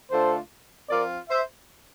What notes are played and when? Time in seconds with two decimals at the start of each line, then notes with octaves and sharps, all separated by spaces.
0.11 D3 A3 D4 F4 A4 C5
0.90 F3 C4 F4 A#4 D5
1.30 C5 E5